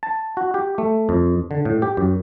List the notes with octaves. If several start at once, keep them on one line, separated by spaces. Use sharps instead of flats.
A5
F#4
G4
A3
F2
D3
A2
G4
F#2